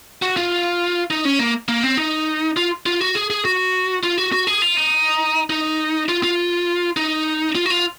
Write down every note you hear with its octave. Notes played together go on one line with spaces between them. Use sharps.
F#4
F4
D#4
C#4
A#3
A#3
C4
D#4
F4
F4
F#4
G#4
G#4
F#4
F4
F#4
F#4
G#4
F4
D#4
D#4
F4
F4
D#4
F4
F#4
F4